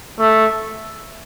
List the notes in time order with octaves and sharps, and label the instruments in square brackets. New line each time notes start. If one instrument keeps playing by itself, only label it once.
[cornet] A3